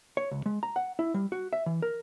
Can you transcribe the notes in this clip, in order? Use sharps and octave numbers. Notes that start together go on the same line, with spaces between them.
C#5
C#2
G#3
A#5
F#5
E4
G3
F#4
E5
E3
A#4